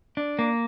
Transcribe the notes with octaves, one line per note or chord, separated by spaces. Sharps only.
D4
A#3